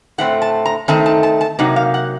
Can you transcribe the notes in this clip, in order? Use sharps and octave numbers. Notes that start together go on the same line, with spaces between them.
A2 A3 C4 F#5
A5
A#5
D#3 A3 C4 D#4 A5
A5
A5
A5
C3 F#3 A#3 D#4 F#5
F5
F#5